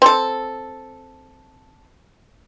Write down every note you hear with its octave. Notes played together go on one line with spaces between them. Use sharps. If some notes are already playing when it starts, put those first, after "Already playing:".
C4 A4